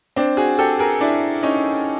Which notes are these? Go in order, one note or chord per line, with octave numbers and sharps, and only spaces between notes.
C4 D4
F#4 G#4
G4 A4
G#4 A#4
D4 E4
C#4 D#4